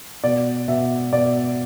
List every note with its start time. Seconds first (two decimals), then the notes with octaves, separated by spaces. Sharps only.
0.24 B2 D5
0.68 B2 E5
1.12 B2 D5